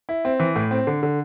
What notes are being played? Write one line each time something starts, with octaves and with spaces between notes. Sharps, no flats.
E4
C4
E3
A2
C4
D3
D3